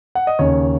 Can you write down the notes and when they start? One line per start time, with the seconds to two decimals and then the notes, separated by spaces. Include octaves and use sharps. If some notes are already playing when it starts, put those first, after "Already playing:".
0.15 F#5
0.27 D#5
0.39 D#2 C#3 C#5